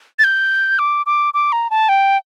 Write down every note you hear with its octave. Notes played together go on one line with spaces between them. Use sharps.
A6
G6
D6
D6
D6
A#5
A5
G5